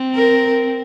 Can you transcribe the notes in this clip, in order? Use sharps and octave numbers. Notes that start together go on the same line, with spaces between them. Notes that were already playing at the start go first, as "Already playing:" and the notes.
Already playing: C4
A#4